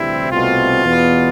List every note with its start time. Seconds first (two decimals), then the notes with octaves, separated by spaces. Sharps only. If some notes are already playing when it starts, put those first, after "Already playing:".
Already playing: D2 C3 E3 G3 C4 E4
0.30 C2 B2 A3 C4 F4
0.85 E2 B2 B3